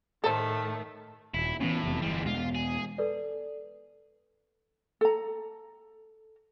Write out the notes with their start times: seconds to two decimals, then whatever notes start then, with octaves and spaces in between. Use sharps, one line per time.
0.24 A2 D#3 A3 A4 C5
1.34 D#1 E4
1.61 A2 E3 B3 C#4
1.84 F1 E2 C3
2.02 G1 E3 G3 G#3
2.26 E2 B2 G#3 F4
2.55 G#4
2.98 A4 B4 D5
5.01 A4 A#5